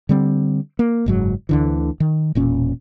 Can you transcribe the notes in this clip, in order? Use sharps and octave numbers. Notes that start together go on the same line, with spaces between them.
D3 G3 C4
A#3
F#1 G#2 F#3
D2 D3 E3
D#3
E1 A#2 C#4